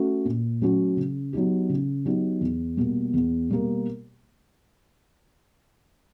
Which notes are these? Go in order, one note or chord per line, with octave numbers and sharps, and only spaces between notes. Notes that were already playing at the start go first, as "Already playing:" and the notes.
Already playing: A3 C#4 F#4
A#2
F#3 A3 C#4 F#4
C#3
F#3 B3 D#4 G4
C#3
F#3 B3 D#4 G4
E2
B2 G3 A#3
E2
B2 G3 A#3